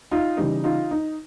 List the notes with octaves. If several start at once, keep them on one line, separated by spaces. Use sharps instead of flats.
D#4 F4
C#3 E3 G3 D#4
D#4 F4
D#4